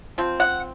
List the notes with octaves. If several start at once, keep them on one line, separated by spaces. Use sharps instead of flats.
F3 C4
F#5